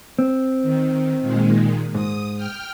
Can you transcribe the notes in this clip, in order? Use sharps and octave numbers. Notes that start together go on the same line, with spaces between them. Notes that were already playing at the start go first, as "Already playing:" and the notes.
C4
D#3
A#2 D#3 G#3
G#2 D#6
G5 F6